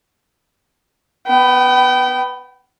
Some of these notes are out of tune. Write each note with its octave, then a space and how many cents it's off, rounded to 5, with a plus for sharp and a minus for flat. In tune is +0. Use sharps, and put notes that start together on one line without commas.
B3 +5 G5 -35